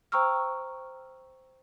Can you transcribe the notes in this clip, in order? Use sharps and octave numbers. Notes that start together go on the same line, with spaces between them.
C5 G5 A#5 C#6 E6 F6